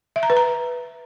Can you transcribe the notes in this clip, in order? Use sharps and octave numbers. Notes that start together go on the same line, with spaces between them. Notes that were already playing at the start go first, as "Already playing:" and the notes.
E5
A#5
B4
A#5